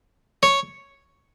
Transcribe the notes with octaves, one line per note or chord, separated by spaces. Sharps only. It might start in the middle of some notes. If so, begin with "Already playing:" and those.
C#5